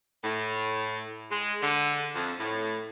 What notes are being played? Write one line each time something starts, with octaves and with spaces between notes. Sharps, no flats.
A2
G#3
D3
F2
A2